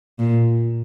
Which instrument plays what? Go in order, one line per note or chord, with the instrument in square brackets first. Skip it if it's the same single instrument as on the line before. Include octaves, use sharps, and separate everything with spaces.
[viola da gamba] A#2